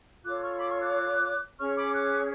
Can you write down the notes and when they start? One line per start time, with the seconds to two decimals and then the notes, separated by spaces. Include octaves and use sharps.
0.24 F4 A4 C#5 D6 F#6
0.41 C#6 F6
0.58 B5 D6
0.69 C#6 F6
0.80 D6 F#6
1.59 C#4 G#4 C#5 C#6 F6
1.76 B5 D6
1.93 D6 F#6